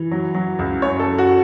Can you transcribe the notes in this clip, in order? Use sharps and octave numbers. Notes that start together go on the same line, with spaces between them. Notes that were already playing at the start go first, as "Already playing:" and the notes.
Already playing: E3
F#3
F#3
C#2
F#2 C#5
A4
F#2
F#4